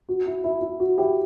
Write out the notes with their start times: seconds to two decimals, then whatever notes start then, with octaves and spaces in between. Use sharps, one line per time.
0.09 F#4
0.26 E4
0.44 E4
0.61 E4
0.80 F#4
0.97 E4 G4